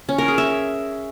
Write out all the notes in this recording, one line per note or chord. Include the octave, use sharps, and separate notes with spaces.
C#4
A#4
G#4
E5